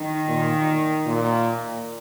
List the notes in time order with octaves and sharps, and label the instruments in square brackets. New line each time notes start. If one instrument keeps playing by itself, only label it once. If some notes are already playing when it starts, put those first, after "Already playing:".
Already playing: [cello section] D#3
[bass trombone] A#2
A#2